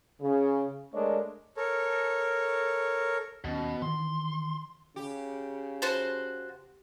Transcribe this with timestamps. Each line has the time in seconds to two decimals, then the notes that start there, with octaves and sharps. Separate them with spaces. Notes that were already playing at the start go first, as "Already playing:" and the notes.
0.21 C#3
0.93 G#3 A3 D4 A#4 C#5 D#5
1.57 A4 A#4 C#5
3.44 D#2 B2 C#4
3.82 D#3 E3 C6
4.96 C#3 G4
5.82 F#4 C5 A5